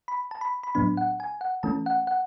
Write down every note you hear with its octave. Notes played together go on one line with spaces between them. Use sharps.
B5
A5
B5
B5
A2 F#3 B3 D4 B5
F#5
G#5
F#5
E3 A3 C#4 A5
F#5
F#5